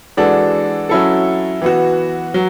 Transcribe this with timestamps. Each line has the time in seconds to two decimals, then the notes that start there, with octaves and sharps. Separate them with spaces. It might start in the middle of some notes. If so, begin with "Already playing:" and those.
0.17 E3 G#3 D4 F#4 A4
0.89 F#3 C#4 E4 A4
1.62 E3 B3 F#4
2.34 F#3